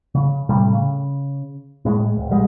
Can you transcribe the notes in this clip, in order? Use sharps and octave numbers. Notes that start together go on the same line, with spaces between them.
C#3
A2 C3 G3 A3
C#3
A2 G#3
D1
A#1 G3 G#3